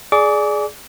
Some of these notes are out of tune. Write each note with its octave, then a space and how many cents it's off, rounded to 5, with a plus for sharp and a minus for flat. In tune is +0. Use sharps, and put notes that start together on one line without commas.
G#4 +15 D5 +0 D6 -30